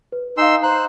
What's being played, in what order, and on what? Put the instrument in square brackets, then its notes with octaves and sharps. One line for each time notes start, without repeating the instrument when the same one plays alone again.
[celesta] B4
[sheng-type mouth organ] D#4 C6 E6 [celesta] F5 G#5
[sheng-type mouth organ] C5 F#6 [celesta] A#5